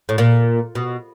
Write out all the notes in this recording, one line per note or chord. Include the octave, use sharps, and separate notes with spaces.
A2
A#2
B2